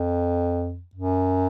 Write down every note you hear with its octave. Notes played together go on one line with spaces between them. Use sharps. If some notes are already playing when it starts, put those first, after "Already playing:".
Already playing: F2
F#2